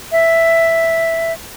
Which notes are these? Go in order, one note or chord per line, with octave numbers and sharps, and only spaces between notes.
E5